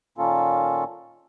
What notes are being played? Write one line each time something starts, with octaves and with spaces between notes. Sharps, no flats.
A#2 D#3 A#3 C#4 F4 A4